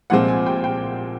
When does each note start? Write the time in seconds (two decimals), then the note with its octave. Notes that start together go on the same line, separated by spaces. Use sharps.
0.10 C2 A#2 F3 G#3 C4 F#5
0.28 G#5
0.46 G5
0.64 G5